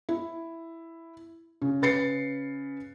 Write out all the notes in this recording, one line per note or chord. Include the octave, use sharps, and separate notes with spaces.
E4
C#3
C#3 B4 A6 C7 C#7